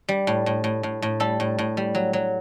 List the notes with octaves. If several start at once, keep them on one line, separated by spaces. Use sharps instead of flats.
G3
A2
A2
A2
A2
A2
G3 A4
A2
A2
G3
F#3
F#3